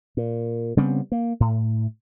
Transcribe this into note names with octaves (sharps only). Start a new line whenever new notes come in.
A#2
C#3 G3 B3 C4
A#3
A2